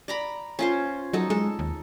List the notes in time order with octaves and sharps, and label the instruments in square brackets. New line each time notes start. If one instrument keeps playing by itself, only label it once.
[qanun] D5 A#5 B5
C#4 F4 C5
[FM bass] F#3 [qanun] D#4 A4
[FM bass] G#3 [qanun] A4
[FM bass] D#2